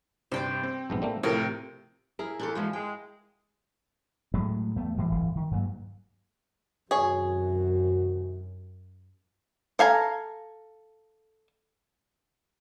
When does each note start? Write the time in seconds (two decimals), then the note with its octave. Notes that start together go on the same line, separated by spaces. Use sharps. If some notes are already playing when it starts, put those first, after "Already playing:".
0.32 G2 C3 C5 G5 D6
0.63 C4
0.90 A#1 G#2 B3
1.02 G3 A3 A#3
1.23 A2 C3 F3 A#4 G5
2.19 E4 G#4 A#4
2.40 E2 D4 G4 A4
2.55 E3 F3 G#3 F#4
2.73 G#3 G5
4.34 A2 F#3 G#3 A3
4.76 E2 A3 B3
4.96 D2 G#2 E3 G#3
5.11 D1 G1 F2 E3
5.35 D#3
5.51 G2 F#3 A#3
6.91 F#2 C3 D#3 F#4 G#4 C#5
9.79 A4 F5 G#5 A#5